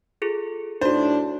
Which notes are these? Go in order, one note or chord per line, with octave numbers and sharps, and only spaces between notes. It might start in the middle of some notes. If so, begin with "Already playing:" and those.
F4 G#4 A4
A2 D4 D#4 F#4 C5